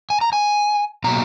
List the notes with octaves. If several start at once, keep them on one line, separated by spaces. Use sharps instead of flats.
G#5
A#5
G#5
B2 F#3 A#3 A#5